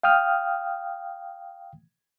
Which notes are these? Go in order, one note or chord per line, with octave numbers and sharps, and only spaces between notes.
F5 G5 D#6 F6